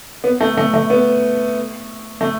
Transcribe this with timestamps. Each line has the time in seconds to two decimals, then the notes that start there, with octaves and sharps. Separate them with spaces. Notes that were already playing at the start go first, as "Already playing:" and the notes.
0.24 B3
0.41 A3
0.57 A3
0.74 A3
0.90 B3
2.21 A3